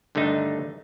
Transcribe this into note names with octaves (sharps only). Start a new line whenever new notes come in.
G2 D3 D#3 A3 D#4